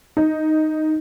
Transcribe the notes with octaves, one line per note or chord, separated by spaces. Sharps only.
D#4